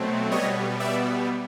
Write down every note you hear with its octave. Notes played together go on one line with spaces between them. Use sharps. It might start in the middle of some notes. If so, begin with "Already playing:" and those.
Already playing: B2 F#3 A3 C4
B2 G3 B3 C#5 D#5
D5 E5